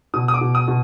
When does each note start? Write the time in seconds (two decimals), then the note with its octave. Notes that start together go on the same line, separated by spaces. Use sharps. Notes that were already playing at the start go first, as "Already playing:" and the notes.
0.14 B2 D#6
0.28 D#6
0.34 D6
0.41 B2
0.55 D#6
0.68 B2